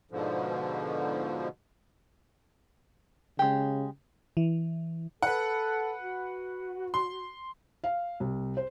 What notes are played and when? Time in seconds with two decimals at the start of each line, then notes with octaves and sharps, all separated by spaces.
0.11 G#2 B2 D3 F3
3.39 C#3 G#3 G4
4.37 E3
5.22 A4 B4 F#5
6.01 F#4
6.94 C6
7.84 F5
8.20 C2
8.57 C5